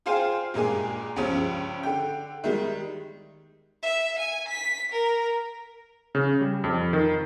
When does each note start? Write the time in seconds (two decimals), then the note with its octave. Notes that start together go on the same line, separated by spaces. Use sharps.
0.06 F4 G#4 C5 F5 G5 G#5
0.54 G2 A#2 G#3 G#5
1.16 C#2 G2 F3 C#4
1.83 D3 G5
2.44 D#3 G3 G#3
3.83 E5
4.19 G#5
4.48 B6
4.92 A#4
6.15 C#3
6.41 G3
6.64 F2
6.93 D#3